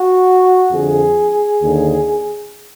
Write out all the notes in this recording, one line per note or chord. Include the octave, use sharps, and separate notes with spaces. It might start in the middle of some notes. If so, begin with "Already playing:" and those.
Already playing: F#4
F2 D3 G#4
D#2 D3